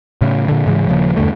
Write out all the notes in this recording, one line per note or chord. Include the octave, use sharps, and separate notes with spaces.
A2 C#3
A#2 D3
G#2 C#3 E3 G#3
D#1 C#3 F3 A#3
E2 G2 D3 A3